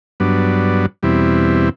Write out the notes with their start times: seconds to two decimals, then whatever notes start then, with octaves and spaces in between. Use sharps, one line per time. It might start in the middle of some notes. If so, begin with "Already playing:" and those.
0.20 G2 F#3 B3 D4
1.03 E2 B2 G3 C4 E4